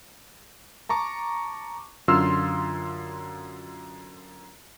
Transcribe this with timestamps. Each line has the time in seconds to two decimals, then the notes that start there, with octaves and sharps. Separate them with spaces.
0.89 A5 A#5 C#6 D6
2.08 F#2 D3 F4 C6 E6 F6